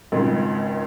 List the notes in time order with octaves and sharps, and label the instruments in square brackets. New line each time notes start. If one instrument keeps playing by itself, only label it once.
[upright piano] G#1 C#2